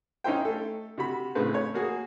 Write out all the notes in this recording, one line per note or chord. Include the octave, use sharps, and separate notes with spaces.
C#4 D#4 E4 C5 G5
A3 A4
C3 F#4 B5
A2 C#3 A3 C4 B4
C#5
A#3 F#4 G#4